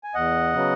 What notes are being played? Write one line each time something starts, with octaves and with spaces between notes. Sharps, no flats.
G#5
E2 D#5 F#5
C#3 F#3 B3